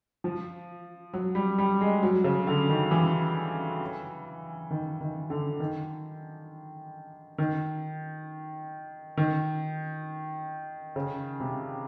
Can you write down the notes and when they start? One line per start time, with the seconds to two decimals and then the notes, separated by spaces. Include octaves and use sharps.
0.24 F3
1.14 F#3
1.35 G3
1.58 G3
1.81 G#3
2.03 F#3
2.24 C#3
2.47 D3
2.69 D#3
2.91 E3
4.70 D#3
5.01 D#3
5.30 D3
5.60 D#3
7.38 D#3
9.17 D#3
10.96 C#3
11.40 C3